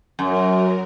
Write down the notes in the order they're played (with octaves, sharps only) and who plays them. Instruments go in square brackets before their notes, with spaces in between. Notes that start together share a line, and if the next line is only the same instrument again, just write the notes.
[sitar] F#2 [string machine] F#3 A#4